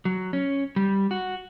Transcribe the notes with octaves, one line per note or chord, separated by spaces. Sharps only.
F#3
C#4
G3
F#4